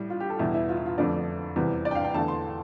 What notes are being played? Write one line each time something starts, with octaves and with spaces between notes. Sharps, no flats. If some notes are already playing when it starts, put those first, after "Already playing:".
Already playing: A2 G3
F4
G4
A4
E2 B2 G3 E4
E4
F4
E4
F4
F2 D3 F3 A3 D5
E2 C3 E3 G3
D5
G5
F5
G5
E2 D3 A3 A5
C6